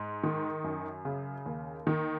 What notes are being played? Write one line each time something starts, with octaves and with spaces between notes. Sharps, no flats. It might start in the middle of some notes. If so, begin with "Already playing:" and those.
Already playing: G#2
D#3
F#2
C#3
D#2
D#3